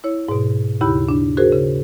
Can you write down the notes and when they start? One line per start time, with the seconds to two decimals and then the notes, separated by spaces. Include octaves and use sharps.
0.04 E4 C#5
0.29 G#2 B2
0.81 D#2 C#3 E4 G4 B5
1.09 D4
1.37 F#4 G#4 A#4 C5
1.52 C#3